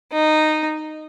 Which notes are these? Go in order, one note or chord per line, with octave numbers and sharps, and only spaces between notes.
D#4